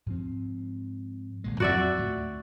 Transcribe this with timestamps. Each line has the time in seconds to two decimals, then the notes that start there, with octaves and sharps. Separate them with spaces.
0.06 G#2 F3 C4
1.44 G#1 A#2 G#3
1.60 F2 F#3 C4 F#4 D5 E5
1.97 D2 A2